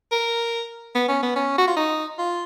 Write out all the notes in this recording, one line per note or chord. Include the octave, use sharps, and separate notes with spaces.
A#4
B3
C#4
B3
C#4
F#4
F4
D#4
F4